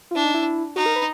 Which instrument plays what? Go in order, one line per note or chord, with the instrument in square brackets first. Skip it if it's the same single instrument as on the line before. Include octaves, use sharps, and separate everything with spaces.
[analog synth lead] F4
[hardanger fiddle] D4 [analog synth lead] E4
[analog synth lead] D#4
E4
[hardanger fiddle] D#4 [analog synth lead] F#4
[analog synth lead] A#4
B4